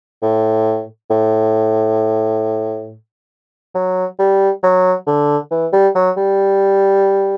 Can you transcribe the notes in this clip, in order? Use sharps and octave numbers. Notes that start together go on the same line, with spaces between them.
A2
A2
F#3
G3
F#3
D3
E3
G3
F#3
G3